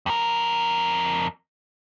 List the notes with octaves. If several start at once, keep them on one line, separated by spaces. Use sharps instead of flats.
F2 A#4